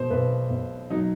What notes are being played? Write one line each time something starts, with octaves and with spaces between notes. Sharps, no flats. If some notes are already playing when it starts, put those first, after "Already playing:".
Already playing: B2 C5
B1 B4
B1
F#3 D#4